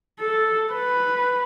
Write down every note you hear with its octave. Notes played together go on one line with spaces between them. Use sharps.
A4
B4